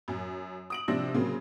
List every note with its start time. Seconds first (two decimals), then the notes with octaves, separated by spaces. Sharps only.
0.08 F#2
0.70 D#6 D7 F#7
0.88 C3 F3 C4 D4 E6 A#6
1.14 C#3 F#3 A#3 C4